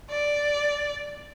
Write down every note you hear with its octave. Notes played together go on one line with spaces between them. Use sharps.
D5